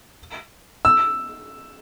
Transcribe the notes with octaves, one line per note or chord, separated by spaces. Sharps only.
E6